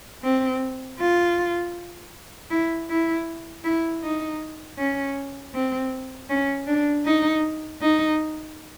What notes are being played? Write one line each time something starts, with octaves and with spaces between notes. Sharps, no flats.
C4
F4
E4
E4
E4
D#4
C#4
C4
C#4
D4
D#4
D#4